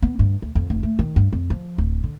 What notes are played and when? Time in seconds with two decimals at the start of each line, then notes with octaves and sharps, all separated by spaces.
0.02 B3
0.19 G2
0.42 D2
0.55 F2
0.70 F1
0.83 A3
0.99 D#3
1.16 G2
1.33 F2
1.50 F3
1.78 D1
2.04 D3